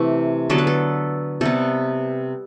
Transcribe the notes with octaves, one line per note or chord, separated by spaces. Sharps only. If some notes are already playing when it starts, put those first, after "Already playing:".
Already playing: C3 E3 A3
D3 F#3 B3 A4
B4
A4
C3 G3 B3 A4